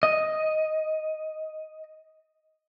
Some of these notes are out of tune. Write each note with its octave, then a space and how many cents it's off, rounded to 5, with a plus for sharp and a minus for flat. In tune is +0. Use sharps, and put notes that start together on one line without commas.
D#5 +5